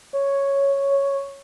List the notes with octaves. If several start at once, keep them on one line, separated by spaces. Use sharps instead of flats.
C#5